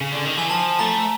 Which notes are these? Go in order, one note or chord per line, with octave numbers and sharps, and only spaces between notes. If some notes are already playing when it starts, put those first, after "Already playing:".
C#3
D3
D#3
E3 G#5
F3 A5
A3 A#5